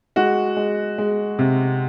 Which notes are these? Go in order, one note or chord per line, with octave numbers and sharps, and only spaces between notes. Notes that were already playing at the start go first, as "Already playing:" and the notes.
G#3 F#4
G#3
G#3
C3